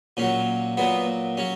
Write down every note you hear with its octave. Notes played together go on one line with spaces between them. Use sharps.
A#2 F#3 C#4
A#2 F#3 B3
F#3 C#4